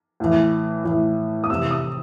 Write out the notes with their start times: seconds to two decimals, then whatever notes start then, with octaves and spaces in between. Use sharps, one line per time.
0.20 A2 E3
0.84 A2 E3
1.44 D#6
1.50 C3 E3 E6
1.71 D#6